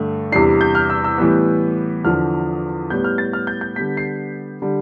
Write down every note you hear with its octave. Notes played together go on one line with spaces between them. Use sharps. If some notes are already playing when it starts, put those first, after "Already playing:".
Already playing: G2 D3 A3
E2 C3 G3 D4 C7
G6
F6
E6
E6
A2 E3 G3 B3
E2 D3 F3 F6
A2 G3 B3 G6
F6
A6
F6
G6
G6
D3 G3 B3 B6
C7
D3 G3